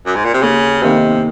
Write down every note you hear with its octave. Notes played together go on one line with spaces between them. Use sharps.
F#2
G#2
A#2
C3
D#2 C#3
C3 D#3 A#3 D#4